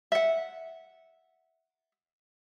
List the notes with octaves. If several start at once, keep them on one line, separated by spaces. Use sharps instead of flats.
E5 F#5